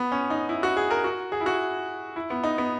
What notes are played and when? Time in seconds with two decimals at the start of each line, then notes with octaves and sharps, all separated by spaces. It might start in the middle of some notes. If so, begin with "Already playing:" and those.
Already playing: B3
0.12 C#4
0.30 D#4
0.49 E4
0.63 F#4
0.77 G#4
0.91 A#4
1.04 F#4
1.32 G#4
1.41 E4
1.46 F#4
2.16 E4
2.30 B3
2.44 D#4
2.58 B3